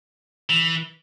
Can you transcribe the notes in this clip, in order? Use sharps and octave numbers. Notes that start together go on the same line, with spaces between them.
E3